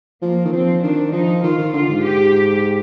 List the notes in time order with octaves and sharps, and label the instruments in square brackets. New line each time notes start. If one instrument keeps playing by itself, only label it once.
[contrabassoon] F3 [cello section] A#3
[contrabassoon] D#3
[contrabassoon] F3 [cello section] C4
[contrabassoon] D#3 [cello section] D4
[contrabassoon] F3 [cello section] D#4
[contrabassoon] D#3 [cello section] F4
[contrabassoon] D#3
[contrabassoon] D3 [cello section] F4
[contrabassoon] G#2
[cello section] G4